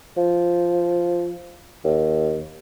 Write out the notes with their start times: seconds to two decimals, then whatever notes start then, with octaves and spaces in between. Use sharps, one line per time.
0.17 F3
1.84 D#2